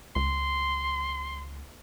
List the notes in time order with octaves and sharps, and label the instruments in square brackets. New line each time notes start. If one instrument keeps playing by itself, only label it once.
[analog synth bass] C#2 [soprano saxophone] C6